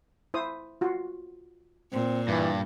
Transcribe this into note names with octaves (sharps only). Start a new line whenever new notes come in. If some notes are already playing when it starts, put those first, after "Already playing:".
E4 C5 D#6
F4 F#4
A#2 C4
G2 E3